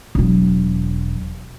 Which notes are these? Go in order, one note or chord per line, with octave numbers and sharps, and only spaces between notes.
E1 F#3